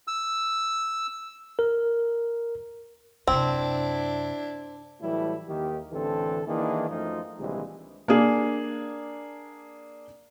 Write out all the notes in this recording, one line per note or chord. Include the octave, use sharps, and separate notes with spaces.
E6
A#4
F#2 C3 C4 D4 E4
A2 E3 F#3 G3 A3 E4
D#2 D#3 G4
A1 D3 E3 C4 A4
D#3 E3 A#3 D4 E4 G#4
F#2 F3 A3 D#4 F4
A#1 C3 D#3 E3 G3 G#3
A#3 D4 G#4